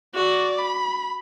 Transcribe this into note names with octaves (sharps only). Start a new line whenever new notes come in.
F#4 D5
B5